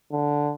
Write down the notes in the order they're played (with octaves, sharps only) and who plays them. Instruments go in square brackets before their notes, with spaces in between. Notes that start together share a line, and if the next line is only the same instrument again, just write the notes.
[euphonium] D3